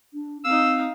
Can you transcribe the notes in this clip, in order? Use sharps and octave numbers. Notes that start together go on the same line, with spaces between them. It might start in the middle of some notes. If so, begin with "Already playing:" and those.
D4
C4 D#4 F5 E6